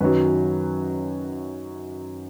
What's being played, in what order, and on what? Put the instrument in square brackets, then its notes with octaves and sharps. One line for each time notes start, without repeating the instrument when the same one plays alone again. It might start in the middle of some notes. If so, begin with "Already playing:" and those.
[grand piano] F#2 D#3 F#3 B4